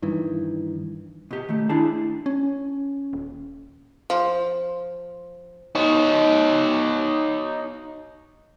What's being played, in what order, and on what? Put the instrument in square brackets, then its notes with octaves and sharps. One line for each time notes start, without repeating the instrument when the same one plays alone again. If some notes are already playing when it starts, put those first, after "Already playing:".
[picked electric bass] G2 D#3 E3
[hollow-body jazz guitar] B2 G4
D#3 A3
D4 E4 G#4 A5
[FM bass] C#4
D#1
[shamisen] F3
[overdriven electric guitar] D#4 C#5